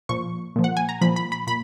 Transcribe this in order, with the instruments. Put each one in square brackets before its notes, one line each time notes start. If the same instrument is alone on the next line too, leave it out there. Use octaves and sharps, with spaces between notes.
[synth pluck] A#2 F3 C#6
A#2 F3
F#5
G#5
A#5
A#2 F3 B5
B5
B5
A#2 B5